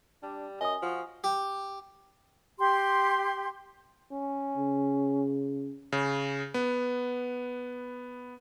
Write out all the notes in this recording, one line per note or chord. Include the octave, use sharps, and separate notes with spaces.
G3 D4
F#2 D#5 G#5 D#6
F3 F#4
G4
G4 C6
C#4
C#3
C#3
B3